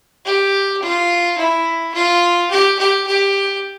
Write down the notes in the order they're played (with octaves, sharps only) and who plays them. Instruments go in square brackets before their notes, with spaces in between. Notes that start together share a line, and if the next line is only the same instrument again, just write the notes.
[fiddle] G4
F4
E4
F4
G4
G4
G4